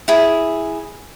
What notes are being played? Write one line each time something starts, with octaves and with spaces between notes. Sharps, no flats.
E4 G#4